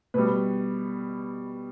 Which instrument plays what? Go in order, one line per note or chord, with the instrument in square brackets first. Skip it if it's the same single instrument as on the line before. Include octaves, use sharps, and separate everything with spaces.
[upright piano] B2 G3 B4